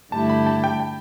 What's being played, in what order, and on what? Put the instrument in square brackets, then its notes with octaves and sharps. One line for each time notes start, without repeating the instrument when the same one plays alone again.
[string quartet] G2 D3 A3 E4 G4 [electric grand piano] A5
[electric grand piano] B5
A5
G5
G5